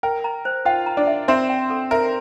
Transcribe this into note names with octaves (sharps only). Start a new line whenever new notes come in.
A#4 G5
A#5
C5
F4 F5 G5
A#5
D4 D5
E5
C4 C5 E5
G5
A4
A#4 E5